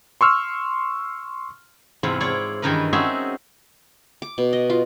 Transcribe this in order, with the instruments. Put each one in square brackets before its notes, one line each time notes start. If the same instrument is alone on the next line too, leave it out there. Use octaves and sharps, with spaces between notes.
[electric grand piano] C6 C#6 E6 F6
[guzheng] E2 G#2 C3 E4 F4 B5
E4 F4 C#5 D5
G2 D#3 E3 D#4 A#4 B4
C4 C#4 D#4 F#4 G#4 E5
[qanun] D6
B2
D#5
F4